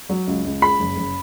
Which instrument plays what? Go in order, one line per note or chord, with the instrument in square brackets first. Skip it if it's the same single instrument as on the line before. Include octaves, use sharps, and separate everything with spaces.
[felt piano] F#3
C#2
C#2
[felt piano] G#3 [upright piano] B5
[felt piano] F#1
F#1